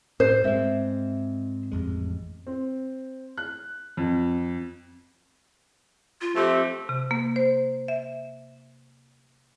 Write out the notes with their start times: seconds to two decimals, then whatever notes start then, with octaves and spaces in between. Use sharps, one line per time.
0.20 A2 C5
0.44 G#2 G#3 C4 E5
1.72 A1 F2 G#3
2.47 C4
3.37 F#6
3.97 F2
6.21 F4
6.36 F3 A3 C4 G4
6.89 C3
7.11 A#3
7.36 C5
7.88 E5